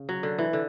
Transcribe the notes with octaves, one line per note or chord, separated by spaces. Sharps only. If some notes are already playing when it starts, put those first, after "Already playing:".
Already playing: C#3
F#3
D3
E3
D3